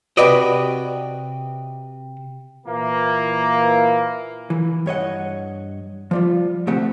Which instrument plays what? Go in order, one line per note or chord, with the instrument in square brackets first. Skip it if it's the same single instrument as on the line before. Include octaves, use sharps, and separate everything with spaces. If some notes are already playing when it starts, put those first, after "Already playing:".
[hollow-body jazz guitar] C3 F#4 B4 D5 D#5
[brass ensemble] A#2 E3 A#3
[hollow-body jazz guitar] E3
G2 C#5 D#5 F#5
F3 G3 F4
D2 C3 A3 C4 G4 F#5